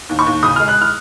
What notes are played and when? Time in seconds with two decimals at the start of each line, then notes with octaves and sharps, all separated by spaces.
0.09 D#2
0.19 C#6
0.27 D#2
0.43 C#3 D#6
0.56 G#3 F6
0.68 F#6
0.82 F6